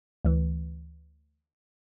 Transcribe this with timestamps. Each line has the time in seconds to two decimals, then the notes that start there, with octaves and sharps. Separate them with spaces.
0.25 D2 E3